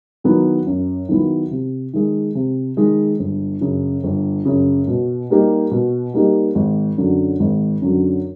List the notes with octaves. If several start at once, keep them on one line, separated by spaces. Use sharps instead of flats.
D#3 F#3 B3 E4
F#2
D#3 F#3 B3 E4
C3
D#3 G#3
C3
D#3 G#3
G1
F#2 C#3
G1
F#2 C#3
B2
G3 A#3 D#4 G4
B2
G3 A#3 D#4 G4
G#1
F#2 D3 F#3
G#1
F#2 D3 F#3